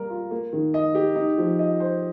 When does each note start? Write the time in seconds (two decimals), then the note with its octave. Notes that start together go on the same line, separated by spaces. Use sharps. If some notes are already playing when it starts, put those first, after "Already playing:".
Already playing: G3 A#3 A#4
0.10 F4
0.31 A#3
0.53 D#3
0.74 D#5
0.95 G4
1.16 D#4
1.38 F3
1.59 D#5
1.80 C5